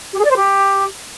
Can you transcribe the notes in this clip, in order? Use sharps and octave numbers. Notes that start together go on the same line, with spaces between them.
G4
G#4
D5
C5
G4